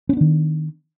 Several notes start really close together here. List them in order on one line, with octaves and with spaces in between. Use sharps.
C#4 B3 D4 D#3